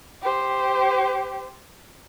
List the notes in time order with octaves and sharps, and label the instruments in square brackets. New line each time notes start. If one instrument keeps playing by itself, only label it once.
[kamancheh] G4 C5